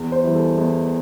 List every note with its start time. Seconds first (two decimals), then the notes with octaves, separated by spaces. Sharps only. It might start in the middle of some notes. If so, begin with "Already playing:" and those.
Already playing: E2
0.12 C5
0.23 E3 G3
0.35 A4
0.58 E2